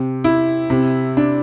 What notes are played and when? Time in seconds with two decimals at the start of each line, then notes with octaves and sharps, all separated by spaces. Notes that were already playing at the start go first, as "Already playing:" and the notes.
Already playing: C3
0.24 E4
0.70 C3
1.17 D4